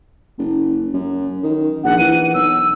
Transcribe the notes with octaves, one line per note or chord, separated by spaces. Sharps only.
F#1
F#2
D#3
A#1 F#5
E3 D#7
B1 E6